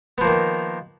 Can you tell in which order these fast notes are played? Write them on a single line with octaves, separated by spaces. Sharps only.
B3 F3 A#3 D#3